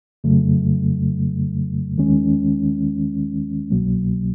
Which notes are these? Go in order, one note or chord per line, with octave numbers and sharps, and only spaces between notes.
F2 C#3 F#3 A3
D#2 D#3 G#3 C#4
C2 B2 F#3 A#3